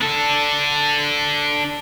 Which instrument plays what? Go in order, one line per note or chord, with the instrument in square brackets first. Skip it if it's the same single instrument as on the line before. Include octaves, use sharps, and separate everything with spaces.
[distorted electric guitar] D4 A4